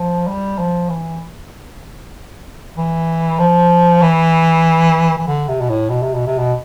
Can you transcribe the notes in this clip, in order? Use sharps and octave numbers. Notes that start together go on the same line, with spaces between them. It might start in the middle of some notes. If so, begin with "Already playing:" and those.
Already playing: F3
G3
F3
E3
E3
F3
E3
E3
D3
C3
B2
A2
B2
C3
B2
C3
B2